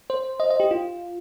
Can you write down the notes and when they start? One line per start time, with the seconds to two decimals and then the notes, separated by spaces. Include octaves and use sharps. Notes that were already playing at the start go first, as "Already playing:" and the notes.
0.10 C5
0.40 D#5
0.50 D#5
0.60 G4
0.71 F4